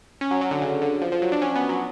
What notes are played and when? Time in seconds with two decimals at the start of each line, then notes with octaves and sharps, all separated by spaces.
0.21 C#4
0.31 F#3
0.41 F#3
0.51 D3
0.61 C#3
0.81 D3
1.02 F3
1.12 F3
1.22 F#3
1.32 D4
1.42 C#4
1.56 B3
1.69 F#3